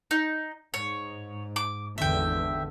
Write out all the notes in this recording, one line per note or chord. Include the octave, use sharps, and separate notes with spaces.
D#4
G#2 C#5
D6
G#1 E2 D3 E5 G5